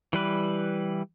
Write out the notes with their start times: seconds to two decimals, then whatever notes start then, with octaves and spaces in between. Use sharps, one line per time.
0.13 E3 G3 B4